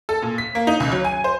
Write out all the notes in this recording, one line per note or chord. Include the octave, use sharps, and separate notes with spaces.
A4
A#2
B6
A#3
D#4
C#2
F#3
G#5
C5